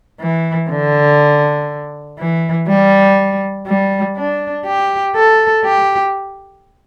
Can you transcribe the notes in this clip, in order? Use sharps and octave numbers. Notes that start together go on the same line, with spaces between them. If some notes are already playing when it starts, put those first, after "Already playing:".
E3
D3
E3
G3
G3
D4
G4
A4
G4